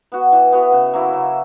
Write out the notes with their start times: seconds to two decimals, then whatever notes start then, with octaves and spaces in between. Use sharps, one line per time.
0.12 B3 F#4
0.32 E3
0.52 B3 F#4
0.72 C#3
0.94 F#3 A#3 E4
1.13 C#3